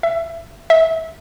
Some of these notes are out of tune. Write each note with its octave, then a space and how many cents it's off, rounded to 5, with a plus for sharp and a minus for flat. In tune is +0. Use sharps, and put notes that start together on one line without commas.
E5 +20
E5 -25